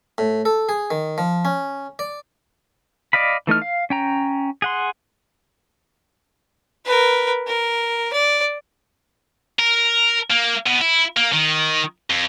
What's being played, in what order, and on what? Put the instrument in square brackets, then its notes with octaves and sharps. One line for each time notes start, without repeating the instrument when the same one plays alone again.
[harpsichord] A2
A4
G#4
D#3
F3
C#4
D5
[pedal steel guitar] D5 D#5 F5 B5
E3 A3 D#4 F6
F5
C#4 G5 A#5
G#4 F#5 C6
[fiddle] A#4 B4
A#4
D5
[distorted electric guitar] A#4
A#3
B2
E4
A#3
D#3
F2